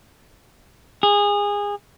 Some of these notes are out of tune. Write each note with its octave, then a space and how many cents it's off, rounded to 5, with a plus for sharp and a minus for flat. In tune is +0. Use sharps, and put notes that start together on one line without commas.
G#4 -25